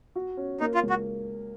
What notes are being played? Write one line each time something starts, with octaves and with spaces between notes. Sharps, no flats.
F#4
C#4
A#3 D#4
F4
C#2
F#4